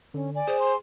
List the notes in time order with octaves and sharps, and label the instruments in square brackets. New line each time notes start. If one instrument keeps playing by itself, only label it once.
[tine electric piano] D3 [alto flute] C#4
[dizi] D5 [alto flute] G#5
[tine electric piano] G#4 [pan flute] C5
[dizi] C6